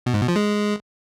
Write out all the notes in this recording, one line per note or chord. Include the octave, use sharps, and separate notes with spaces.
B2
G#2
B2
F3
G#3